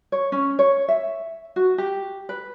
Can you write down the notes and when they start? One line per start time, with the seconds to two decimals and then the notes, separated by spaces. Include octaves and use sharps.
0.12 C#5
0.32 C#4
0.59 C#5
0.88 E5
1.56 F#4
1.78 G4
2.29 B4